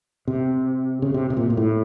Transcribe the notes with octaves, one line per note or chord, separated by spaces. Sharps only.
C3
C#3
C3
C3
A#2
A#2
A2